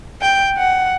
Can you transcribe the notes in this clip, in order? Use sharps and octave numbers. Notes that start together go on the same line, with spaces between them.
G5
F#5